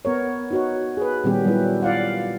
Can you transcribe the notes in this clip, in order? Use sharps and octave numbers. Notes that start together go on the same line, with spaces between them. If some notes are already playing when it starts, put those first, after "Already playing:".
B3 A#4 C#5
D#4 F#4 C#5
G#4 B4
A#2 D#3 G3 B3 C#4 G4
F#3 G3 E4 B4
F4 D5 F5 F#5